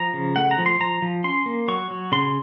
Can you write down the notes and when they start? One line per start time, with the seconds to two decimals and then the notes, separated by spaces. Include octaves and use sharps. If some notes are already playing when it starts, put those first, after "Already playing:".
Already playing: F3 A#5
0.14 C#3
0.36 A3 F#5
0.51 A#5
0.58 F3
0.66 C6
0.80 F3 A#5
1.02 F3
1.24 C#4 C6
1.46 A#3
1.68 F#3 C#6
1.91 F#3
2.12 C#3 C6